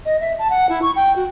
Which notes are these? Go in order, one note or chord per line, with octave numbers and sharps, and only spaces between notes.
D#5
E5
A5
F#5
E4
C#6
G5
F#4